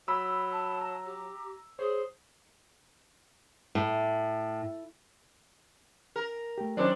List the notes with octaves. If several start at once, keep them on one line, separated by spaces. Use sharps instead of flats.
F#3 B5 E6
A5
A#5
G4
G#4 C5 C#5
A2
A#4
A3 G4
D#3 F#3 C#4 D4 C5